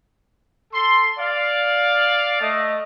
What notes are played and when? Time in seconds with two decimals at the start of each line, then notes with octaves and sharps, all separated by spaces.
0.74 A4 C6
1.18 D5 F5
2.41 A3 D#5